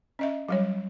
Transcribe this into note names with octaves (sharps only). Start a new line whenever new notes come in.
C#4 D#5 E5
F#3 G3 C#5